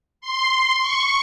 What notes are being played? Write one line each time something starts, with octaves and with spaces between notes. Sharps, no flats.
C6
C#6